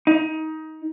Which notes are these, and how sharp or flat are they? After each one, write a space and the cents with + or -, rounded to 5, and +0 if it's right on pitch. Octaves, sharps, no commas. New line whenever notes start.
D#4 +20